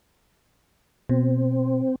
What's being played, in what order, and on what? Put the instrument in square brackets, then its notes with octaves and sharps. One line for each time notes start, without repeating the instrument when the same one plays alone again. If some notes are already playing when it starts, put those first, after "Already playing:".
[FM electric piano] B2 [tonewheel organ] C4